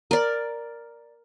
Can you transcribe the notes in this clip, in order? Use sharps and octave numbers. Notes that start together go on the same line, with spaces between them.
A#4 D5